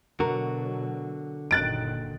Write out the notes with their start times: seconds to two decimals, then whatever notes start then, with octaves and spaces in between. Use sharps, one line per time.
0.20 B2 D3 F#3 F#4 A#4
1.51 F#1 A#2 D#3 F#6 A6 D7